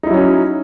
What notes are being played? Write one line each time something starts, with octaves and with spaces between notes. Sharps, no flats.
F#3 C#4 D#4 E4